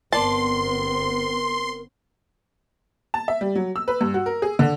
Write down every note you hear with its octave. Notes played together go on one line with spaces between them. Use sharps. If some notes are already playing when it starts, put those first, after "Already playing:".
G1 B3 C4 A#4 D5 A5 C6
A5
E5
G3
F#3
E6
B4
G2
F#4
A#4
G#4
D3